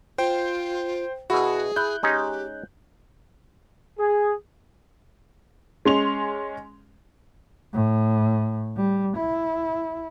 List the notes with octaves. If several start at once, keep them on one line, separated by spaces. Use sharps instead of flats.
F4 C5 G5
B2 E4 F#4 G#4
E4 F#6 G6
G#3 C#4 D#4 G4
G#4
G#3 C#4 C6 F7
A2
G3
E4